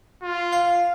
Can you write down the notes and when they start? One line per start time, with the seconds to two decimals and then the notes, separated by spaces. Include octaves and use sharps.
0.22 F4
0.52 F5